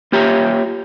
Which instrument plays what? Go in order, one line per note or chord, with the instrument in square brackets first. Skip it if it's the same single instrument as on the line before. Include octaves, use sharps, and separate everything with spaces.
[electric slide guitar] A#3 F4 G4 C#5 E5 A#5